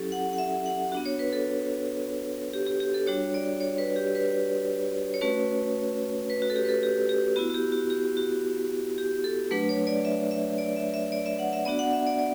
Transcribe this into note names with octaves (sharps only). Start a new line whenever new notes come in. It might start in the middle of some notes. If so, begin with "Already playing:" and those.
Already playing: F#3 C#4 E4 G4 A4
F#5
F#5
E5
F#5
B3 D4 F#4
C#5
B4
A4
G4
G4
G4
A4
G3 D4 F#4 C#5
D5
C#5
B4
G4
B4
C#5
A3 C#4 F#4 B4
B4
F#4
A4
G4
B4
A4
G4
G4
B3 E4 F#4
F#4
G4
F#4
G4
F#4
G4
A4
F#3 A3 D4 B4
C#5
D5
E5
E5
D5
E5
E5
D5
E5
F#5
E5
B3 D4 F#4 D5
F#5
E5
D5
D5